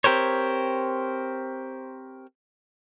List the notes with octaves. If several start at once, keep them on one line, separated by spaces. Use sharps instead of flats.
C4 G4 A#4 C5 C#5